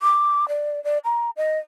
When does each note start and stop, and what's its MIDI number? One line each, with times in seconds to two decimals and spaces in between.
0.01 0.48 86
0.48 0.82 74
0.84 0.98 74
1.05 1.30 82
1.37 1.59 75